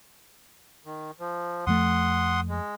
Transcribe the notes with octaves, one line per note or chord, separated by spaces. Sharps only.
D#3
F3
F2 F3 A3 F#5 C6 D#6
G#3